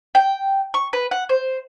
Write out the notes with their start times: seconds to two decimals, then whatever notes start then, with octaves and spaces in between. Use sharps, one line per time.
0.15 G5
0.74 C#6
0.93 B4
1.11 F#5
1.29 C5